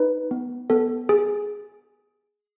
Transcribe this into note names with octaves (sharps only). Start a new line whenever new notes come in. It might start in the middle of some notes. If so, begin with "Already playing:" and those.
Already playing: D#4 B4
B3
B3 A4
G#4